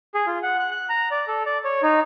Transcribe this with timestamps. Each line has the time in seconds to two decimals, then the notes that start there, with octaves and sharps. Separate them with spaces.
0.15 G#4
0.27 F4
0.43 F#5
0.59 F#6
0.71 F#6
0.89 A#5
1.11 D5
1.28 A4
1.46 D5
1.65 C#5
1.83 D#4